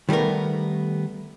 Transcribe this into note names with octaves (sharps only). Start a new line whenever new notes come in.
D#3 G3 A3 B3 A#4